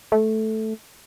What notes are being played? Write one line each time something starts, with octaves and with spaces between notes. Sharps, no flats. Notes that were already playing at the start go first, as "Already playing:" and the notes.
A3